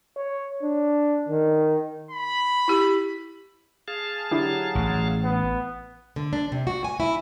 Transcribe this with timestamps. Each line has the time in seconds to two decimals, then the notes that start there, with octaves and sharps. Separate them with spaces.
0.17 C#5
0.62 D4
1.29 D#3
2.11 B5
2.68 E4 G4
3.88 G#4 F5 A5
4.31 D3 F#3 E4 G4
4.75 A1
5.24 B3
6.16 D3
6.33 D4
6.52 C3
6.67 F#4
6.84 G#5
7.00 E4